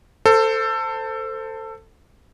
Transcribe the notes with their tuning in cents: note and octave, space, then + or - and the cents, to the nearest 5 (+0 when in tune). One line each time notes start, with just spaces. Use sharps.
A4 +20 C5 -5